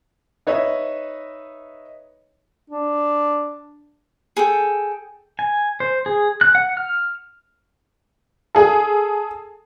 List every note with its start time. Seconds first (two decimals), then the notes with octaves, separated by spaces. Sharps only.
0.47 D#4 B4 C#5 D#5 E5
2.70 D4
4.37 G#4 A4 G5
5.39 G#5
5.80 C5
6.06 G#4
6.41 F#6
6.55 F#5
6.77 F6
8.55 G#4 A4